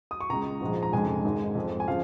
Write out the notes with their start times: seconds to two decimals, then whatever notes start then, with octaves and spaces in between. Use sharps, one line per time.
0.11 D#6
0.20 C#6
0.29 C#2 C#3 G#3 A#5
0.61 A#1 G#2 F3 G#3
0.83 A#5
0.93 F1 F2 C#3 G#3 G#5
1.24 G#1 G#2 D#3 G#3
1.55 F2 F3 G#3
1.80 G#5
1.88 C#3 F3 G#3 F5